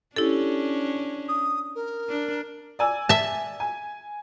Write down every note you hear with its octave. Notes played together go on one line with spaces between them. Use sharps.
C#4 D4 E4 G4 A4
D#6
A#4
D4
D5 G#5 E6
E5 A5
G#5